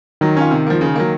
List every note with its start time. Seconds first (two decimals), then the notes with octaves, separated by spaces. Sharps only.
0.21 D#3 F#3
0.37 C#4 F4
0.51 C3
0.67 F3 A#3
0.81 C#3
0.96 F#3 A#3